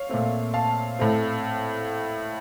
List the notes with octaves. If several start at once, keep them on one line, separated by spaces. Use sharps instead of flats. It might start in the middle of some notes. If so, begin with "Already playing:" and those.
Already playing: C#5 F5
A#2 A3 C4
F5 A5
A2 A3 C4